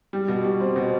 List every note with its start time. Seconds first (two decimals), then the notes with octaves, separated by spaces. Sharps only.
0.13 G3
0.28 B2
0.44 G3
0.60 C4
0.76 B2